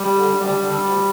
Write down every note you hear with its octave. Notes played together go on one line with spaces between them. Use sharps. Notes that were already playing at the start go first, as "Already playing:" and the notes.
Already playing: G3
D3
D2 G3
D3
D2